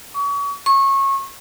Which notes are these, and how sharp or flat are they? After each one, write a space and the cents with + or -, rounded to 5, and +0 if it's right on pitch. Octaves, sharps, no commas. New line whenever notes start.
C#6 +35
C#6 -25